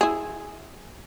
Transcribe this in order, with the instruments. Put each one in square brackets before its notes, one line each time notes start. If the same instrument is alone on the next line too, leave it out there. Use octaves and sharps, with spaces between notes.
[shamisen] E4 G#4